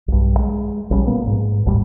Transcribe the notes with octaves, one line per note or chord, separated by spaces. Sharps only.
B1 G2
G#3
A#1 G3 C#4
A#2 A#3 B3
G#2
G#1 D#2 A2 G3